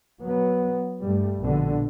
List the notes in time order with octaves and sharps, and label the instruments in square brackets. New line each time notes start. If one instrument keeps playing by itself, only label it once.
[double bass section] F#3 B3
G2 G3 A3
A#1 B2 D3